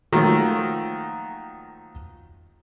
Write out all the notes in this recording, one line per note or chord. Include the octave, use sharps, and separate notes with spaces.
D#3 F3 F#3 A3 A#3